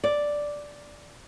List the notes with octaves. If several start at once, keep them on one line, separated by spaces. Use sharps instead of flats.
D5